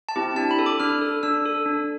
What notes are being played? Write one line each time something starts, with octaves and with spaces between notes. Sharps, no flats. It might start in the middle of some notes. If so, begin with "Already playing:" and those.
A5
C4 E4 G4
D4 A5
B5
A4
D6
D4 F6
A4
D4 E6
A4
D4